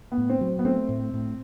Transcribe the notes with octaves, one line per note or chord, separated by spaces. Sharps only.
B3
A2
C4
F#3
B3
A3 C4
A2
A2